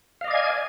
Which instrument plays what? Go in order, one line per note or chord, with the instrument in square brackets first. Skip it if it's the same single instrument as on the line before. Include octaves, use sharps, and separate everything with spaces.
[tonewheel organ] F5
D#5
D5
G#6
G#5